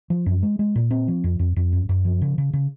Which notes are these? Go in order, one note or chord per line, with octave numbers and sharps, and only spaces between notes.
F3
F#2
G#3
G#3
A#2
C4
F3
F2
F2
F2
F#2
F#2
F3
C#3
C#3
C#3